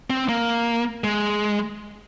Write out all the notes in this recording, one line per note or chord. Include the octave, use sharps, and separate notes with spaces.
C4
A#3
G#3